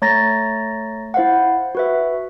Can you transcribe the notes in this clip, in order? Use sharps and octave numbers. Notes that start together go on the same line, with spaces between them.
A3 C#5 A#5 A6 A#6
E4 C5 F5 F#5
F#4 B4 E5